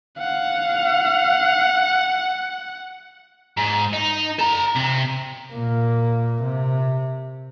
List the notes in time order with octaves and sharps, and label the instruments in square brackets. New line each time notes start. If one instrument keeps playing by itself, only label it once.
[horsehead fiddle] F5 [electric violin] F#5
[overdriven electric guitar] G#2
D#4
A4 A#5
C3
[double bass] A#2 A#3
C3